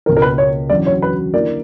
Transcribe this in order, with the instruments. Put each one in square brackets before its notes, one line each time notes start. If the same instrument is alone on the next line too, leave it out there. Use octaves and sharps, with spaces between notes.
[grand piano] C#2 B2 A#3 C#4 [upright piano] A#4
[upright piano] A#4
B4
C#5
[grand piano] E2 D3 F#3 C#4 F#4 [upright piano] D5
[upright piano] C#5
B4
[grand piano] D3 A#3 E4 A#4 [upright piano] D5